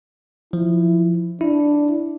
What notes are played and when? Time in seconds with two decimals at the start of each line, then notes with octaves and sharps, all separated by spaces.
0.53 F3 E4
1.41 D4 E4